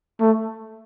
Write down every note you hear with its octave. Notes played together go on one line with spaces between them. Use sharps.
A3